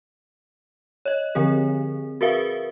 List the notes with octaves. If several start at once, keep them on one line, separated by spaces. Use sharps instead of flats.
C#5 D#5
D3 F3 C4 G#4
F#4 G#4 A#4 B4 E5 F5